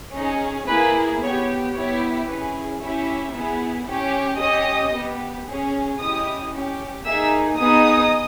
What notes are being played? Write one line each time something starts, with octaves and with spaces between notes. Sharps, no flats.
C#4 D#4 G#4 D#5
A#3 E4 G#4 B4
B3 G4 C#5
B3 E4 G4 C#5
C#4 E4 G#4 B4
C#4 E4 G4 E5
B3 E4 G#4
C#4 G4
C#4 G4 D#5 D#6
B3 G4
C#4 G#4
C#4 E4 G4 D#5 D#6
C#4 G4
A#3 D#4 G#4 E5 E6
B3 D#4 G#4 D#5 D#6